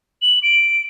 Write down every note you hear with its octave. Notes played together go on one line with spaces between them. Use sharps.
F#7
D7